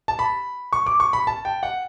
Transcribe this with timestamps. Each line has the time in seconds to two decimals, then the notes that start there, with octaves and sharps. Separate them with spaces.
0.08 A5
0.19 B5
0.73 C#6
0.86 D6
1.00 C#6
1.13 B5
1.27 A5
1.45 G5
1.63 F#5